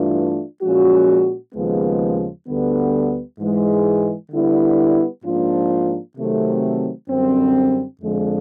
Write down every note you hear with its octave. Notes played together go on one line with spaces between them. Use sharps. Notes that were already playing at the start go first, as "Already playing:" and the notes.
Already playing: G2 E3 A3 D4 F4
A#2 F3 G#3 C#4 F#4
D#2 C#3 F3 G#3 B3
D2 D3 G3 B3
G#2 E3 G#3
D3 G3 B3 E4
G#2 F3 A#3 D4 F4
C3 D#3 F#3 A3 C4
F#2 D3 G3 C4
F2 D3 F3 G#3